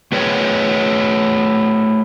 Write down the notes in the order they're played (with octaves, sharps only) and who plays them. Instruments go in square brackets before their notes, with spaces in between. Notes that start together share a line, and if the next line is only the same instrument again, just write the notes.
[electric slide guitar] A3 G#4 B4 C#5 G5